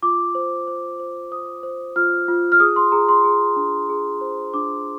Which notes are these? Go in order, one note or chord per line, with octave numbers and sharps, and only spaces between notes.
F4 D6
C5
C5
C5
C5 D#6
C5
F4 F6
F4
F6
G#4 D#6
C6
G#4 A#5
C6
G#4
D4
G#4
C5
D4 D6